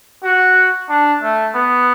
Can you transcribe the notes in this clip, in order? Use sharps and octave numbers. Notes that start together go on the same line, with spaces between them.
F#4
D4
A3
B3